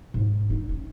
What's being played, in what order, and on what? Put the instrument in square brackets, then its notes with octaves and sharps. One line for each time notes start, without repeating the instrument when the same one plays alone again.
[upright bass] G#2
D#4
C#4